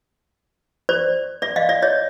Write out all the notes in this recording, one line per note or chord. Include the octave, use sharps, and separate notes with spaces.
C5 D5
D5 E5
D#5 F5
D5 E5
C#5 D#5